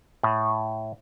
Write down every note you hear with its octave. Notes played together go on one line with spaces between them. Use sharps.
A2